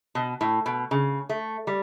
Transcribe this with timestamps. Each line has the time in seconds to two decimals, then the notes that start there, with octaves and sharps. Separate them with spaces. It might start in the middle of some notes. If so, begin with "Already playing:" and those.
0.15 B2
0.41 A2
0.66 B2
0.91 C#3
1.29 A3
1.67 G3